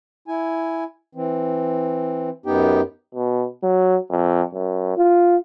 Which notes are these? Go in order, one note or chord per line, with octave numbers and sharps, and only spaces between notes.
E4 G#5
E3 C4
F#2 B3 D#4 G4 G5
B2
F#3
F2
F#2
F4